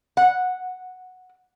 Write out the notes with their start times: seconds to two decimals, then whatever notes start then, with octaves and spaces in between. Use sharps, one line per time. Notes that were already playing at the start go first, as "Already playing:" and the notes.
0.17 F#5